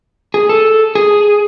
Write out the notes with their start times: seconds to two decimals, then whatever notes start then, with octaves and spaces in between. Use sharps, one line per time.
0.34 G#4
0.49 A4
0.95 G#4